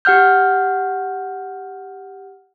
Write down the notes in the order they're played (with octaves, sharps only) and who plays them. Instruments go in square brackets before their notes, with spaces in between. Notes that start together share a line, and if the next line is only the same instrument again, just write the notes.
[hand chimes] G4 F#5 F6 G6